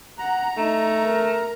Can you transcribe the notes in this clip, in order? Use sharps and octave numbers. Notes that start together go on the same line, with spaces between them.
F#5 A#5
A3 D#4
A#4